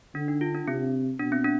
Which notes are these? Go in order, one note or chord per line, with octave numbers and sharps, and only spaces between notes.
D3 D4
D#4
F4
D4
C3 C4
B2 D4
C4
D4